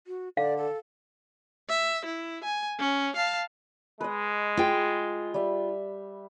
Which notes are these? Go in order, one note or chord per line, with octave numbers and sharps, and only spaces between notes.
F#4
D3 D5 F5
A4
E5
E4
G#5
C#4
F5 A5
G#3 B4 D#5
F4 G#4 G5
G3 E5